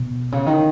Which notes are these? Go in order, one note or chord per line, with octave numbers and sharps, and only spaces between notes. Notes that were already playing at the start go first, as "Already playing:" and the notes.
Already playing: B2
C#3
D#3